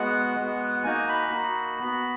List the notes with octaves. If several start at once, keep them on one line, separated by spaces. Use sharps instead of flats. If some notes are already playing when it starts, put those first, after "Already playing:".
Already playing: G#3 B3 F#4 F#5
G#3 B3 F#4
A#3 D#4 F#4 G#5
B5
A#3 D#4 F#4
B3 F#4